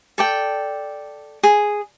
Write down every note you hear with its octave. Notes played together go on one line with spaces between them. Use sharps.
A4 D5 G5
G#4